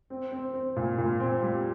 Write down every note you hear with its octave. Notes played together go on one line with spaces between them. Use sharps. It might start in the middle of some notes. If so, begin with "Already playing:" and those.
C4
C4
C4
A#2
A#2
C4
G3